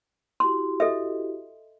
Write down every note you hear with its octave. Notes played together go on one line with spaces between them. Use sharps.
E4 F#4 G4 C6
A4 D#5 E5